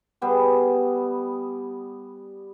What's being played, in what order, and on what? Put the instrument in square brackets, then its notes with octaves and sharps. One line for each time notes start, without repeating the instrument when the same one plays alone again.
[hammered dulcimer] G3 B3 G#4